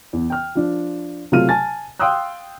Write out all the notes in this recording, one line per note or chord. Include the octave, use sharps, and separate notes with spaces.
E2
G5 F6
F3 D4
C3 F#3 A3 F4 F6 D#7
G#5 A5 A6
F5 G5 C6 D#6 E6 F#6